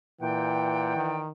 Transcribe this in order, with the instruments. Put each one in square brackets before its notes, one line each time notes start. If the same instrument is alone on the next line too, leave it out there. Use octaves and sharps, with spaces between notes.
[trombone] A#2 [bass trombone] E3 [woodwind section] D5 F#5 G5
[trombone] D#3